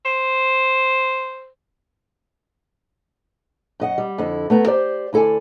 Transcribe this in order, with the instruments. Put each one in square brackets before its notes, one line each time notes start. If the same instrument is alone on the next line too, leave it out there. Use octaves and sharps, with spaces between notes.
[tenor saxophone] C5
[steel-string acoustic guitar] F#2 D#5 F#5
G3
F2 D3 E4
A3 B3 A#5
G4 C5 D5
D2 E4 A4 D5 G#5